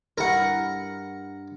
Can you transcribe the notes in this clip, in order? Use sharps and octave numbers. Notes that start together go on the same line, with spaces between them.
G2 E4 A#4 F#5